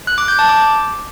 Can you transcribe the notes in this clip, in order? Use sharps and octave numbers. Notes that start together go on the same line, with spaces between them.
F#6
D6
G6
A5
D6